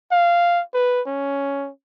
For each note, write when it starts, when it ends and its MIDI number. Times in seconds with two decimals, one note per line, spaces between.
0.12 0.62 77
0.74 1.01 71
1.06 1.70 61